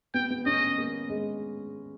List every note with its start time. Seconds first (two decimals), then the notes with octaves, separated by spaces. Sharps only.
0.14 B3 G5
0.30 B3
0.46 C#4 D#5
0.61 C#4
0.78 A#3
1.10 G#3